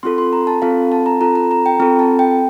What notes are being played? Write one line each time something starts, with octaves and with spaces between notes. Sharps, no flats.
C4 F4 A4 C6
C6
A#5
A5
C4 F4 A4 F5
A5
A#5
C4 F4 A4 A#5
A#5
A#5
G5
C4 F4 A4 A#5
A5
G5